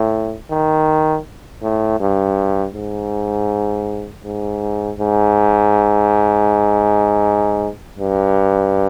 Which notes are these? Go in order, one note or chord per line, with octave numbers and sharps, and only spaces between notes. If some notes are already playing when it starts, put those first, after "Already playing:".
Already playing: A2
D#3
A2
G2
G#2
G#2
G#2
G2